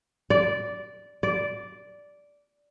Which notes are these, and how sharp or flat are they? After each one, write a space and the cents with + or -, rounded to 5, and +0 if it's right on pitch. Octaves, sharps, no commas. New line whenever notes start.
D5 -10
D5 -10